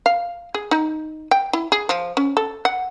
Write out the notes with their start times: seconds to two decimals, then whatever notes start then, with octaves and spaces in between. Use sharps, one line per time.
0.06 F5
0.54 G#4
0.71 D#4
1.31 G5
1.53 E4
1.72 G#4
1.89 F3
2.17 C#4
2.37 A4
2.65 F#5